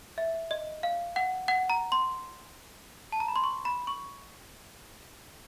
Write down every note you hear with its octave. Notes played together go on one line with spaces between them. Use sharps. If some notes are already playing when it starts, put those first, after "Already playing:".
E5
D#5
F5
F#5
F#5
A#5
C6
A5
A#5
B5
C6
C#6
B5
C#6